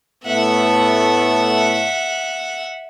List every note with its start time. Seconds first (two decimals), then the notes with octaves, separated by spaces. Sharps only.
0.24 A2 A3 B3 E5 F#5